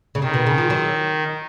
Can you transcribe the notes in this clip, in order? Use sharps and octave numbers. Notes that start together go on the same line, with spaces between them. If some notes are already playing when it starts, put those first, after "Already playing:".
C#3
C3 D#3
B2
C#3
F3
F#3